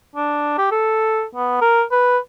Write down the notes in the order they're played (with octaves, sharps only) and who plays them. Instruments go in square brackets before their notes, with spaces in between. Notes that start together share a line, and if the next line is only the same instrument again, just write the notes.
[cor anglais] D4
G4
A4
B3
A#4
B4